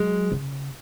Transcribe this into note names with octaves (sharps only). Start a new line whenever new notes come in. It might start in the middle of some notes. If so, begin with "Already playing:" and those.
Already playing: F#3 G#3
C#3